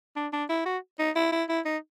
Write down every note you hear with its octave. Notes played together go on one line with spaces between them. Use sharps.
D4
D4
E4
F#4
D#4
E4
E4
E4
D#4